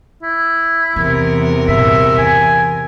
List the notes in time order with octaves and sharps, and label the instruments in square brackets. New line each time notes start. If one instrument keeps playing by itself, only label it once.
[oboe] E4
[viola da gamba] E2 C3 A#4 [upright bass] E3
[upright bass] G2 A#2 [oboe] E5
[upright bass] E3 [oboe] G#5